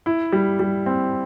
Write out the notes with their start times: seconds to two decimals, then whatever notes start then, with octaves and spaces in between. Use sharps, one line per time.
0.06 E4
0.33 G3
0.59 G3
0.86 C4